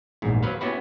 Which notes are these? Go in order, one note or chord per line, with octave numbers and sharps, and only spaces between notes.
A#1 E2 G#2
F#3 B4 C5 F5
B3 C#4 E4 F#4 G4 B4